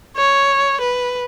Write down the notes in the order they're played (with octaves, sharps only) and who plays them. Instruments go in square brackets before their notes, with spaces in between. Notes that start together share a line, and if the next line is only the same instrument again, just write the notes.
[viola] C#5
B4